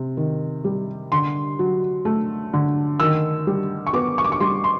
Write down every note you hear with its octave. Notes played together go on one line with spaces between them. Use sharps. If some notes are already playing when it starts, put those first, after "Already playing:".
Already playing: C3
D#3
G3
D3 C6
F#3
A3
D3
D#3 E6
G3
C#6
B3 D6
C#6
D6
C#6
G3 C6
C6